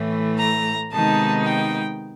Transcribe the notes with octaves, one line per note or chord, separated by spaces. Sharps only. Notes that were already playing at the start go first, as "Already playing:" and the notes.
Already playing: A2 E3 A3
A#5
C3 D#3 G#3 B3 D#4 A5
G5